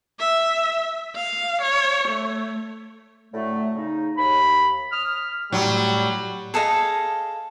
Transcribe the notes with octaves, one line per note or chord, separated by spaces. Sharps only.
E5
F5
C#5
A3
A2 D3 F#3 A3
C#3 D#4
D#2 B5
D#6 F6
A2 F#3 G3 G5 C6
G#4 A4 D#5 F5